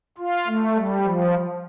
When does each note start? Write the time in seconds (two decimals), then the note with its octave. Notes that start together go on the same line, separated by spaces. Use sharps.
0.18 F4
0.47 A3
0.76 G3
1.05 F3